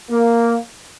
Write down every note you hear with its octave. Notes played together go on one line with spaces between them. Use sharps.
A#3